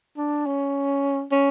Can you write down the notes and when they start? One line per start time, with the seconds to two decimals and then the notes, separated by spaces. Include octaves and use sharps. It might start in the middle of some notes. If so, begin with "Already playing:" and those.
0.17 D4
0.46 C#4
1.32 C#4